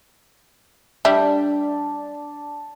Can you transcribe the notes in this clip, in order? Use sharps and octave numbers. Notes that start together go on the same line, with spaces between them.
G3 D4 E5